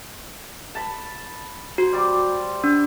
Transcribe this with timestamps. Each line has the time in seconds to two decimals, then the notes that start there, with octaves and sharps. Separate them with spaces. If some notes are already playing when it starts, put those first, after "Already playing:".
0.75 A5 B5
1.78 F#4 C5
1.93 G3 D5 D6
2.64 D4